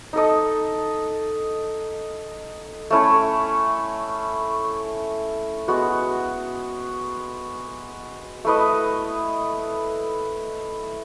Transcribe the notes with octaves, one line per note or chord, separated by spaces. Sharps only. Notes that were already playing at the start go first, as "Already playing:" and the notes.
D#4 A4 D#5
A3 C#4 E4
G#3 B3 F#4
A3 E4 B4 D#5